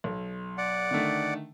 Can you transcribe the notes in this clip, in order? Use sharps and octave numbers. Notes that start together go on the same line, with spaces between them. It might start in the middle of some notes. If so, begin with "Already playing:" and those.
B1
D5 F#5
D3 D#3 A3